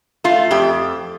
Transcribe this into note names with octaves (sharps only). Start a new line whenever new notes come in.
A3 F4
F2 G4